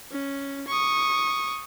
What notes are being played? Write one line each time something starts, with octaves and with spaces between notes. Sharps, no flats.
C#4
C#6 D#6